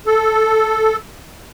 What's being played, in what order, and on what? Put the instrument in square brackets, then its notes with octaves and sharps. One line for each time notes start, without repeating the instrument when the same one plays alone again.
[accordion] A4